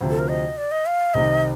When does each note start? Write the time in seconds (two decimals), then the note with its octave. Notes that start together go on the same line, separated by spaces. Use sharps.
0.01 D2 C3 F3 C4
0.10 A4
0.19 A#4
0.29 D#5
0.57 D5
0.71 D#5
0.86 F5
1.14 C2 C3 D#3 D#5